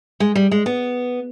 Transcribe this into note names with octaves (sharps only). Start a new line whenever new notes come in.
G#3
G3
G#3
B3